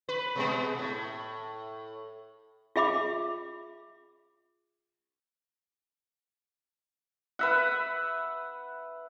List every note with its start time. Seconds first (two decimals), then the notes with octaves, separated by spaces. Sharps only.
0.09 B4
0.35 B2 G#3 B3
0.79 A2
2.76 F4 G#4 E5 B5 D6
7.39 B4 E5 F#5